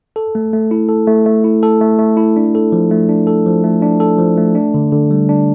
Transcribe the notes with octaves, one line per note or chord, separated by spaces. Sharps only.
A4
A3
A3
E4
A4
A3
A3
E4
A4
A3
A3
E4
D4
A4
F3
A3
D4
A4
F3
A3
D4
A4
F3
A3
D4
D3
D3
G3
D4